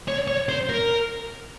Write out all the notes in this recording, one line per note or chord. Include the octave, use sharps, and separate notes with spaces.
C#5
C#5
C5
A#4